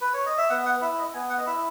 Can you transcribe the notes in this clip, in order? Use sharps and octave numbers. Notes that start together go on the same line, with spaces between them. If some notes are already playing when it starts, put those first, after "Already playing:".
B4
C#5
D#5
E5
B3 F#5
F#5
E4 E5
D#5
B3 G#5
F#5
D#5
E4 E5